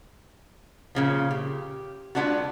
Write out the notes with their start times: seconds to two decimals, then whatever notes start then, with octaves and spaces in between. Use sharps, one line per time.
0.95 A#2 C#3 F3
1.31 G4
2.15 G#3 A#3 B3 D4 F4 F#4